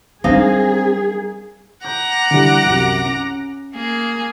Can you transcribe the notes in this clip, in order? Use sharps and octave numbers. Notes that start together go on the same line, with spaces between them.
F#2 G3 C4 D4 D#4 G#4 F5
F#5 A#5 D6 G6
D3 E3 G3
C2 F#2
C#4
A#3 G#4